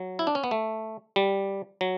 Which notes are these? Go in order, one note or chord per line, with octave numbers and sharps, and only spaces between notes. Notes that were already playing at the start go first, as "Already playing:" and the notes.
Already playing: F#3
E4
D4
C#4
B3
A3
G3
F#3